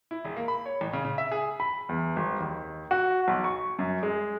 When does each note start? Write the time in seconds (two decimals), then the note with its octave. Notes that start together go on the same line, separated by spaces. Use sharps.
0.11 E4
0.25 E1
0.36 A#3
0.48 B5
0.66 C#5
0.81 A1
0.93 C#3
1.05 C#3
1.18 E5
1.32 G#4
1.60 B5
1.89 E2
2.16 G#1
2.40 D#2
2.91 F#4
3.28 B1
3.44 C#6
3.79 F#2
4.03 G#3